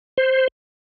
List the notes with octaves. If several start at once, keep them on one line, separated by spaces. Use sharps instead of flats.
C5